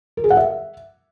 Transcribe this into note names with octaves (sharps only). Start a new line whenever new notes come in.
A#4
G#4
F#5
E5